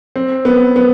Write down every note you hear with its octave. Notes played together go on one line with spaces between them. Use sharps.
C4
B3
B3